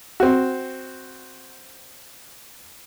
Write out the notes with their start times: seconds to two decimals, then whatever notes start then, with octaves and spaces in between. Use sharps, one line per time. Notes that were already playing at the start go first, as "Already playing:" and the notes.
0.20 C4 F#4